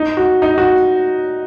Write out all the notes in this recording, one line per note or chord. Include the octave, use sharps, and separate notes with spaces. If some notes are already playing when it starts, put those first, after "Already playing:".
Already playing: D#4
F#4
D#4
F#4